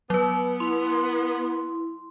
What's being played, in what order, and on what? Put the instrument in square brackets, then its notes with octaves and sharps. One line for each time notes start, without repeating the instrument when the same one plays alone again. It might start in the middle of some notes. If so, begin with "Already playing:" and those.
[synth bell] F#3 B4 [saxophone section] B3
[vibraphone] E4 [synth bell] C6